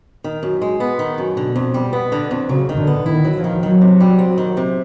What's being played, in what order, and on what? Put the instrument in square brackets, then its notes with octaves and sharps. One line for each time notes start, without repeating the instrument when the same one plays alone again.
[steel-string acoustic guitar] D#3
F#2
G#3
B3
D#3
F#2
[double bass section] B2 [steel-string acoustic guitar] D3
[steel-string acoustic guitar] F2
G3
B3
D3
F2
[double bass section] C#3 [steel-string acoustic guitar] F#3
[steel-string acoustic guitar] D#3
[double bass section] D3
[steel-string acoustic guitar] B3
[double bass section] D#3 [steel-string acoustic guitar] E4
[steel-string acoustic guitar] F#3
[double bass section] F3
[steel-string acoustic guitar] D#3
[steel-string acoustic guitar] D#3 [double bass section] F#3
[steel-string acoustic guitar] C3
G3
C4
D#3
C3